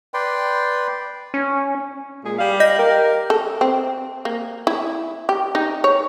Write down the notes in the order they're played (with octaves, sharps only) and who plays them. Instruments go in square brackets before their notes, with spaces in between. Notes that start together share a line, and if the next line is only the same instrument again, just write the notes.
[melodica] B4 D5 G5 C6
[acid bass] C#4
[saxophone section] A#2 G#3 G#4
G3 F5
[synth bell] D#5 G6 A#6
[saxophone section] G4 A#4
[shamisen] A4
C4
A#3
E4
G4
D#4
C#5